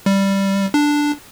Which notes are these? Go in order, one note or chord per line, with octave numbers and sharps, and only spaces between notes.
G3
D4